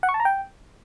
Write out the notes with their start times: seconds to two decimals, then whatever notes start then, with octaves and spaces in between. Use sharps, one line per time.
0.03 F#5
0.09 C#6
0.14 A5
0.20 A#5
0.25 G5